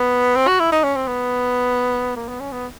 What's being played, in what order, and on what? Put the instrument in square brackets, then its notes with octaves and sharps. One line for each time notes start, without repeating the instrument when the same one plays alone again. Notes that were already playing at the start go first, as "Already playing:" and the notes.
Already playing: [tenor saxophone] B3
C4
F#4
E4
D#4
C#4
C4
B3
A#3
B3
C#4
B3